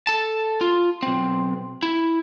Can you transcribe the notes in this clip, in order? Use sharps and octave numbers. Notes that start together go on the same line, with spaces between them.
A4 A5
F4
B1 C4
E4